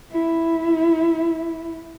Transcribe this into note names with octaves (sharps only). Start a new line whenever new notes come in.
E4